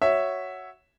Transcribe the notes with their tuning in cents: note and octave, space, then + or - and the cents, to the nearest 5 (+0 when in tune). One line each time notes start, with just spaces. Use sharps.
F#4 +0 C#5 +0 E5 +0